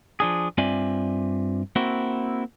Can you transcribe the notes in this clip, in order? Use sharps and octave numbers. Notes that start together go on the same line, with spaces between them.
F3 D4 G#4
G2 C4 F4 D5 E5 G#5
A#3 C4 E4 F#4